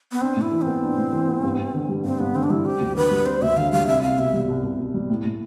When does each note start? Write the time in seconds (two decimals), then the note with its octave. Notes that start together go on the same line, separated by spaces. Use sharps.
0.12 B3
0.21 C4 D4
0.36 A2 E4
0.52 E3
0.62 C4
0.67 B3
0.82 D4
0.97 A2
1.13 E3
1.28 B3
1.43 G2
1.58 G2
1.74 D3
1.89 G3
2.04 G2 C4
2.19 G2 B3
2.35 D3 C4
2.43 D4
2.50 G3 E4
2.65 C4 G4
2.80 D2
2.96 D3 B4
3.11 G3
3.26 C4 C5
3.42 D2 E5
3.57 D3 F5
3.72 G3 F5
3.87 C2 E5
4.03 C2 F5
4.18 B2 E5
4.33 G3
4.49 C2
4.63 C2
4.79 B2
4.94 G3
5.10 A2
5.25 A2